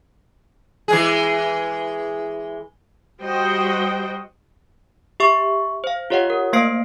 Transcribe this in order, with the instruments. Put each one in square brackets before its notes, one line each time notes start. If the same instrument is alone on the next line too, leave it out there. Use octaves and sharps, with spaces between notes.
[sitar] E3 G#3 G#4
[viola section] G3 F#4 C5 D#5 G5
[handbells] G4 E5 C#6
C5 F5
F4 G4 C#5 D#5 F#5
A#4
A3 A#3 C5 F5 C7 D7